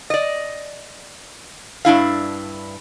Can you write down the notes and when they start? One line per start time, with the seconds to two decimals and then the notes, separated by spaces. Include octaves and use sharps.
0.10 D5 D#5
1.85 G2 D4 E4 F5